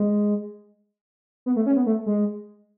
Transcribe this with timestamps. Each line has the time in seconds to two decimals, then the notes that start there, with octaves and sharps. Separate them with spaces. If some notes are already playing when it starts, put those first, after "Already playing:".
Already playing: G#3
1.46 B3
1.56 A3
1.66 C#4
1.76 B3
1.86 A3
2.06 G#3